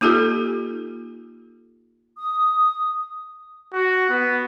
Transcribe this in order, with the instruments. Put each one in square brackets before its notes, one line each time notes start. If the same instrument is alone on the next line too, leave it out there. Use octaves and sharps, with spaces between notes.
[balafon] A#3 D#4 F4 G4 A4
[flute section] D#6
[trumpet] F#4
B3